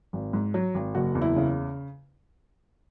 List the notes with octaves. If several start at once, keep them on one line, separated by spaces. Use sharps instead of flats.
G#1
G#2
F#3
G#1
F#1 F#4
E2
E4
C#3